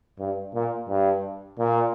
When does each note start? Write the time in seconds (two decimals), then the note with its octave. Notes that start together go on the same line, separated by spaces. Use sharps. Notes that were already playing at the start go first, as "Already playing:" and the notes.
0.19 G2
0.54 A#2
0.89 G2
1.59 A#2